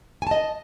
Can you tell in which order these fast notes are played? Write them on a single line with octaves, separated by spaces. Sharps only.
G#5 A5 D#5